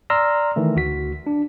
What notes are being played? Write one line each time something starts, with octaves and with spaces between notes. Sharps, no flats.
D5 A#5 C6 E6 F6 A#6
D#3 E3 A3
D2 F#4 B6
D4